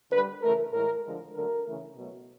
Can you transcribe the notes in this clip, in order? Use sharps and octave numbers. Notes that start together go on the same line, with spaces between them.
D3 G3 B4
C#3 E3 A3 A#4
A2 E3 G#3 A#4
D3 F3 G#3
D3 F#3 A3 A#4
C#3 E3 A3
B2 F#3 A3